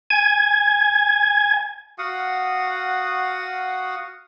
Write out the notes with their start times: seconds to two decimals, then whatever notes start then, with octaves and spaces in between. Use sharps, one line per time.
0.10 G#5 G#6
1.98 F#4 F5 F#5 D#6